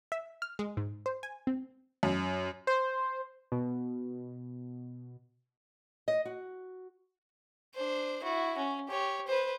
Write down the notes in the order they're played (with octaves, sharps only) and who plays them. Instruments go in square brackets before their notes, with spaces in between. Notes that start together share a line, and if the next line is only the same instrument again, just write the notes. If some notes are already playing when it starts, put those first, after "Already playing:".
[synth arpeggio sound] E5
F6
G#3
G#2
C5
G#5
C4
[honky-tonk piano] F#2
[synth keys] C5
B2
[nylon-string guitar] D#5
F#4
[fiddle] D4 C5
E4 F#4
C#4
G4 C#5
B4 C5